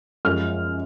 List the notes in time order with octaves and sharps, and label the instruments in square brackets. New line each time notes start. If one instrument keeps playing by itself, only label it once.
[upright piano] F#2 F3 G#3 F6